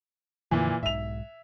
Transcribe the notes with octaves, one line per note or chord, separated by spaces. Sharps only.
F2 A#2 D3 E3 F3
B1 G#2 E5 F7